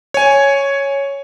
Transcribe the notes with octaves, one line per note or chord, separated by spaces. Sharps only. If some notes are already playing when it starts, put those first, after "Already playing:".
C#5 G#5